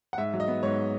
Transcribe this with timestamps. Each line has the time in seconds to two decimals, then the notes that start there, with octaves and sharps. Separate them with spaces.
0.13 F#5
0.18 G#2 E5
0.34 F#3
0.40 D#5
0.48 B3
0.63 G#2 C#5